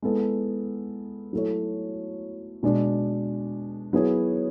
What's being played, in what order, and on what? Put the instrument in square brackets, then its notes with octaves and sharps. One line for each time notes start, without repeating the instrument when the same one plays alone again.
[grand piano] G#3 B3 E4 A4
F#3 A3 E4 A4 C#5
B2 G#3 D4
F#3 B3 E4 G#4 C#5